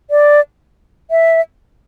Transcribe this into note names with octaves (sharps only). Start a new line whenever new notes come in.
D5
E5